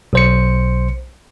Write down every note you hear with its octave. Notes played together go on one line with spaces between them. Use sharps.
B1 C5 C#7